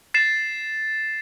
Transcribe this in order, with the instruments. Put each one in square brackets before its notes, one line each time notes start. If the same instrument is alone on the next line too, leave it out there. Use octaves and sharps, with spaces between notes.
[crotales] A6 C7 E7